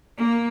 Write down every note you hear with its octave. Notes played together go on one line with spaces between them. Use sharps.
A#3